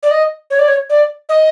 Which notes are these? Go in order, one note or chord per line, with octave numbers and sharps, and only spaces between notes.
D5
D#5
C#5
D5
C#5
D5
D#5